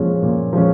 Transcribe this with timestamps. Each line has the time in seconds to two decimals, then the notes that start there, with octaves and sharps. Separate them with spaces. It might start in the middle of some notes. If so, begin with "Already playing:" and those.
Already playing: A#2 F3 G#3 C#4
0.22 A#2
0.53 F3 G#3 C#4